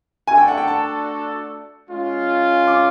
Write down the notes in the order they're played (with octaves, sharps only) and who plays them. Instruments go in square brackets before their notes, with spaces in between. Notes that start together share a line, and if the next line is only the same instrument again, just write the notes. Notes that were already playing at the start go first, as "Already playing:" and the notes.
[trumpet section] A3 D4 F#4 A4 D5 [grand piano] G#5
[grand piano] G5
F#5
G5
A5
[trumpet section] G#3 C#4 F4
[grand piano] D6